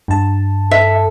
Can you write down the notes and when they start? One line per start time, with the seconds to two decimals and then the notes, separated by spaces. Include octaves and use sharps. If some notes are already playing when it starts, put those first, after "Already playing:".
0.08 G2 A5
0.71 A4 E5